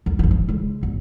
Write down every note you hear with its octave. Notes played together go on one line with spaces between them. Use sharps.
E2
G1 D#3
E3
C#3 G#3
G1